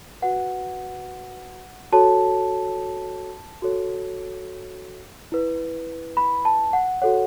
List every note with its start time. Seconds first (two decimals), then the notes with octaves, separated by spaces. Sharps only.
0.22 F#4 B4 F#5
1.92 F#4 A4 C#5 A5
3.62 F#4 A4 C#5
5.32 E4 B4
6.17 B5
6.45 A5
6.73 F#5
7.02 F#4 A4 C#5 F#5